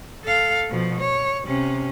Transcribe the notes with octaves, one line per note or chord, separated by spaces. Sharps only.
A4 F5
B2 F3
C#5
C3 C#4